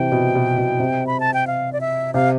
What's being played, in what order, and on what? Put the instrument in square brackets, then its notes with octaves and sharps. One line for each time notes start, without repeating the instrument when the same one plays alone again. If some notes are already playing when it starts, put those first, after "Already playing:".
Already playing: [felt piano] C3 E3 [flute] G5
[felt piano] B2
B2
B2
C3
[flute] B5
A5
G5
F5
D5
E5
[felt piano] C3 [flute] F5